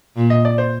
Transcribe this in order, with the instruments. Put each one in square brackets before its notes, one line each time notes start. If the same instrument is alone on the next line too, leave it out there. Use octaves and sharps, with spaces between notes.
[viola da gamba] A#2
[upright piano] D#5
D5
C5